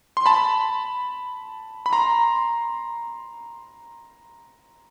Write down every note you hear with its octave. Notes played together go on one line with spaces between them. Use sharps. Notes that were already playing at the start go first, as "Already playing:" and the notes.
C6
A5 B5
B5
A#5 C6